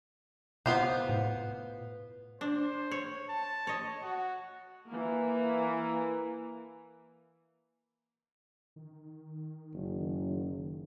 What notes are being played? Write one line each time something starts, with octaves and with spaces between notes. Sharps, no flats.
C3 B3 F4 C5
A2
D4 C5
C#5
A5
C#5 D#5
F#4
E3 A#3
D#3
F#1